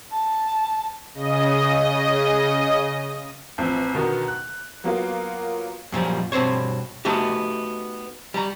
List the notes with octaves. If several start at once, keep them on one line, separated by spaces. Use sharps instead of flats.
A5
C#3 D#5
A1 F3 C4
B2 D3 D#3 B3
F#6
F#3 A#3 B3 F4
F#2 A#2 F3 G3
G2 B2 C4 C5 C#5
A3 B3 D#4 F#4 G4
G3 A#5